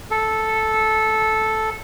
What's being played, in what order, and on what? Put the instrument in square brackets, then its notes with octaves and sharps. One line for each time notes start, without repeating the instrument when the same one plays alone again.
[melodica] A4